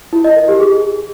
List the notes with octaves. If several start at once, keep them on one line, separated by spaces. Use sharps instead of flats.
E4
D#5
A#4
G4
G#4